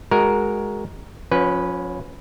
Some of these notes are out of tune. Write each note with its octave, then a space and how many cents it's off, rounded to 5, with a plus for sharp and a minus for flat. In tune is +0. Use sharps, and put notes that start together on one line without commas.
G#3 +0 F#4 +0 A#4 +5
F3 +40 C#4 +0 B4 +0